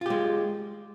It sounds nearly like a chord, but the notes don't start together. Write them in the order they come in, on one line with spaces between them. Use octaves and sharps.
F4 G4 G#3